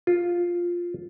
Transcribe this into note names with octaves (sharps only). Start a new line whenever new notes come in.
F4